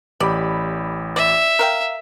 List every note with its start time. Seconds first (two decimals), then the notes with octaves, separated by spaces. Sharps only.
0.20 A1 G4 D5 B5
1.16 D5 E5
1.59 A#4 F5 G5